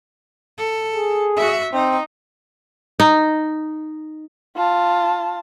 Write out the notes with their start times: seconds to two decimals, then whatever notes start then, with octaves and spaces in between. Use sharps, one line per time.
0.58 A4
0.95 G#4
1.36 F#4 E5
1.73 C4 D#4
3.00 D#4
4.56 F4 A5